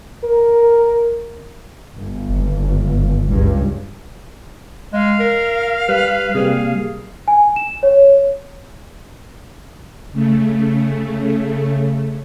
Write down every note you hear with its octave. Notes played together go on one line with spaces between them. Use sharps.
A#4
G1
F#1
C#2 G2
G#3 F5
A#4
G3 B4
C3 G3 A#3 G#4
G#5
E7
C#5
C#3 A3